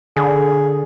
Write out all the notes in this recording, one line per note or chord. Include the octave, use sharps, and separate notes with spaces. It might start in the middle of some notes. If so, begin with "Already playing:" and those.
D3 G#4